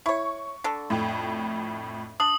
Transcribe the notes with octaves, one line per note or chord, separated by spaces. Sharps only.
E4 C#5 C#6
D3 A4
F2 A2
D4 D#6 F#7